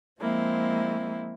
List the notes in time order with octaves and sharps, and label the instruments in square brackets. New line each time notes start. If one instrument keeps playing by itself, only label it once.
[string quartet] F3 G#3 A#3 C4 E4